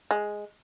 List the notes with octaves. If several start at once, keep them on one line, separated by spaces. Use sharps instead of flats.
G#3